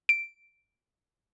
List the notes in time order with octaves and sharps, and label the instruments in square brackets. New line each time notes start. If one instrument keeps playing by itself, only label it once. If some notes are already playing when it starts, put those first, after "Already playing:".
[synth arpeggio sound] D7